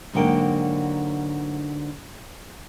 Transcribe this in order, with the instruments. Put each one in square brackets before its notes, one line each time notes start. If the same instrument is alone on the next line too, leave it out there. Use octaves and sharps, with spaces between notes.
[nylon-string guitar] G#2 D3 F#3 A#3 G5